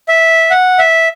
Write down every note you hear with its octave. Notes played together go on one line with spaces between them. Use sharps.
E5
F#5
E5